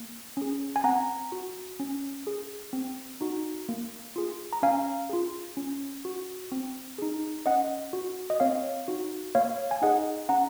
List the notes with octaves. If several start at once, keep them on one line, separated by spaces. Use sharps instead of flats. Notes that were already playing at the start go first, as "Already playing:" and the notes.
Already playing: A#3
C#4 G#4
G#5
C4 F#5 A#5
F#4
C#4
G#4
C4
D#4 F#4
A#3
F4 G#4
A#5
C#4 F5 G#5
F4 G#4
C#4
F#4
C4
D#4 G#4
C#4 D#5 F#5
F#4
D#5
C4 C#5 F5
D#4 F#4
A#3 C#5 F5
G#5
D#4 G#4 D#5 F#5
C#4 F#5 A#5